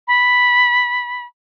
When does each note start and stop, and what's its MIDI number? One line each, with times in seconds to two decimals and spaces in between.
0.08 1.25 83